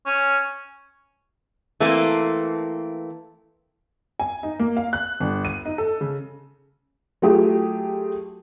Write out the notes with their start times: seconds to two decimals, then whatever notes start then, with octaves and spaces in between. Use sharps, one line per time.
0.06 C#4
1.80 E3 A3 A#3 C4
4.20 G#5
4.43 D#4
4.59 A#3
4.77 F5
4.93 F#6
5.20 G1
5.45 D#7
5.65 D#4
5.78 A4
6.01 C#3
7.22 F#3 A3 F4 G4 G#4